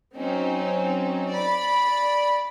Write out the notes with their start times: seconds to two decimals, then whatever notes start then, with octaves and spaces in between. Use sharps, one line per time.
0.15 F#3 C4 C#4 D#4
1.31 D5 B5